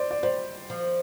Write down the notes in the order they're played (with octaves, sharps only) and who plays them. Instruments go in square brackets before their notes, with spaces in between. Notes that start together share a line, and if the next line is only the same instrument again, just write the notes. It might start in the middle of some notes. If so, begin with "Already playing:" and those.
Already playing: [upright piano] C5 D5
D5
[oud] G3 [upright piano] C5
[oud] F3